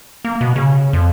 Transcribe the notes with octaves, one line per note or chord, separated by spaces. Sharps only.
A#3
B2
C#3
F2